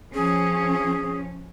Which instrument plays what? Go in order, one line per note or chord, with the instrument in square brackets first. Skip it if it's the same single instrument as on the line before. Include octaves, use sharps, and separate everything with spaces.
[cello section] F3 C#4 [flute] G#4